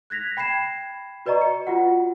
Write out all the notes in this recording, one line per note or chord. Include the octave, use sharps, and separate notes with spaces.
F#6 G#6 A#6 B6 F7
G5 B5 G#6 C7 E7
F#4 B4 D5 D#5 A#5 C#6
C#7
F4 F#4 F#5